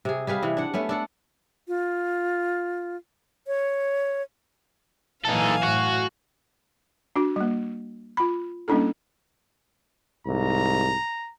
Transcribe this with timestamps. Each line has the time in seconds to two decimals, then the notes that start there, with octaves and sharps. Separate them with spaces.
0.05 C3 G#4
0.27 G3 G#4 B4 F5
0.43 C3 E3
0.57 D4 F#5
0.74 A3 B3 C#4
0.89 D4 A4 F#5
1.68 F4
3.47 C#5
5.25 F#2 A#2 E3 D#4 A4 F5 G#5
5.63 A2 F#4
7.16 D4 F#4
7.36 G3 A#3
8.17 F4 B5
8.68 G3 A#3 C#4 D4 E4 A4
10.27 C2 G#2 A#5